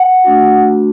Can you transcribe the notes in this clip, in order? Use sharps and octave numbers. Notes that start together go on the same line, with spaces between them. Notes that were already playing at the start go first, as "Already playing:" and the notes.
Already playing: F#5
A3 D4 F#4